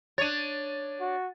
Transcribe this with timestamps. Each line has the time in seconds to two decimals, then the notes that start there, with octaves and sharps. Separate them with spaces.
0.18 D4 C#5 A6 D#7
1.01 F#4